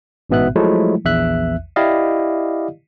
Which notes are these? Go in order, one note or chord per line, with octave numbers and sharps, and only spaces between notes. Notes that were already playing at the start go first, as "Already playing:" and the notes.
A1 G#2 B2 B3 E5 F#6
F3 F#3 G#3 A3 E4
A#1 E2 E5 F#6
E4 G4 D5 D#5 F5